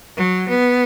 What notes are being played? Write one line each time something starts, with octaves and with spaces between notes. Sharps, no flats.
F#3
B3